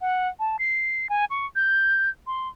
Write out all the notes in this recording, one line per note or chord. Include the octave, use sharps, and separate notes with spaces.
F#5
A5
C7
G#5
C#6
G6
C6